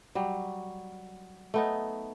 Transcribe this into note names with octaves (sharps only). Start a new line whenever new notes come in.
F#3 G3
A3 B3 D#4